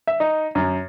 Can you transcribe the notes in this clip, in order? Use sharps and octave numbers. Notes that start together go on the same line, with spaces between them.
E5
D#4
F#2